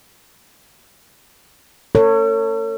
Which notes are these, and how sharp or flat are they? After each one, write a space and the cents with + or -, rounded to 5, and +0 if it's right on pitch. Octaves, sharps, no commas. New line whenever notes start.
A4 +45 C#5 +0